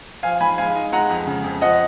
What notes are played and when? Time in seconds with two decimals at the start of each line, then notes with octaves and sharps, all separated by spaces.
0.23 F3 F5 G#5
0.40 G#2 G#5 B5
0.58 G#3 F5 G#5
0.76 D#4
0.92 G#3 F#5 A#5
1.10 F2
1.27 C#3
1.44 F2
1.61 F3 D#5 F#5